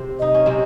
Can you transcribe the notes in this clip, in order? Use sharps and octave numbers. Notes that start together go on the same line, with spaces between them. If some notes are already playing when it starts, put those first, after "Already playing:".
Already playing: C3 C4
D#4 D#5
C#4
C3 C4